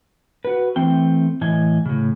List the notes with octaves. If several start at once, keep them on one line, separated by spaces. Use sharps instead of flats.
F#4 B4
E3 A3 C4 G5
A2 E3 D#5 G#5
A2 C#3